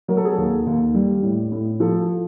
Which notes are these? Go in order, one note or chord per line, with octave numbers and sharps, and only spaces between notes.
F#3 A#4
A4
G#4
A4
D#2
D#2
G3
A2
A2
F3 A4